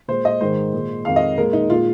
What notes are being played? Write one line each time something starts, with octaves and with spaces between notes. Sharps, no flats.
A#2 G#3 C5
D#5
G#2 D#3 G#3 C5
A#2 G#3
F2 D#3 G#3 F5
D#5
A#2 G#3 A#4
D#4
A#2 G#3 F4